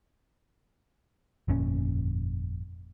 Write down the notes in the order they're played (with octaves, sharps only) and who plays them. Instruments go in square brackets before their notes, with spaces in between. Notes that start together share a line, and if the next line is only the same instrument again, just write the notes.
[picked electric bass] G1 F2 A#2 C#4